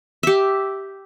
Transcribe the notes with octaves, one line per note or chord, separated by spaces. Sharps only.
G4 E5